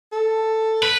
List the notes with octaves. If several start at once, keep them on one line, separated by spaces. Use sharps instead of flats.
A4
B4